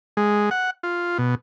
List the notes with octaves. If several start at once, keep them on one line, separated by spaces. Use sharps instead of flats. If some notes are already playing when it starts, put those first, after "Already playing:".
G#3
F#5
F4
B2